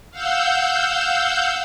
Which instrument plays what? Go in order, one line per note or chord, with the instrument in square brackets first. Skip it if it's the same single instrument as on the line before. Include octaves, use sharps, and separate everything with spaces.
[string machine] F5 F#5 E6 G6